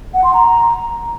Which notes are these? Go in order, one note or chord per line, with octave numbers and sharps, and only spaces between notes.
F#5
C6
A#5